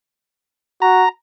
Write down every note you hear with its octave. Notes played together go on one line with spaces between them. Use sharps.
F#4 A#5